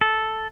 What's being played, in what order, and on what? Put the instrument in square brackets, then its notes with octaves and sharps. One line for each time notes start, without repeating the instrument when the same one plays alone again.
[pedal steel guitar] A4